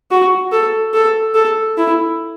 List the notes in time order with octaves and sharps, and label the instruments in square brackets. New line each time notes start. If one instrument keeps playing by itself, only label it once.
[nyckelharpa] F#4
A4
A4
A4
E4